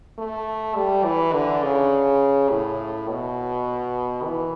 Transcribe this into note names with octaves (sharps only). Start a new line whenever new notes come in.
A3
G3
E3
D3
C#3
A2
B2
E3